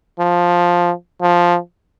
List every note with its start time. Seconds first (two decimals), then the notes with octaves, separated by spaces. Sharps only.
0.20 F3
1.21 F3